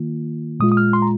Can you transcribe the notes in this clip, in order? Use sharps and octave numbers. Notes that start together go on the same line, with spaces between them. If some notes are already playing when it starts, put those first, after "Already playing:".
Already playing: D#3 A#3 F4
A#2 G#3 F4 D#6
D#6
F6
C6
A#5